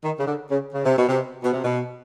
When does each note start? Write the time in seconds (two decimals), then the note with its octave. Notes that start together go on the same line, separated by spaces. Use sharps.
0.03 D#3
0.18 C#3
0.27 D3
0.50 C#3
0.73 C#3
0.85 C3
0.97 B2
1.08 C3
1.43 B2
1.53 C3
1.63 B2